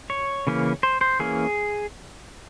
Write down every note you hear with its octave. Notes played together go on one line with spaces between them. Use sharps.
C#5
C#3 E3 A#3 C#4
C5
C5
E3 A#3 C#4 G#4